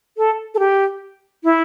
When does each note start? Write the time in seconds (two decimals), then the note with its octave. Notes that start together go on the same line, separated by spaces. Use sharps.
0.17 A4
0.55 A4
0.59 G4
1.44 E4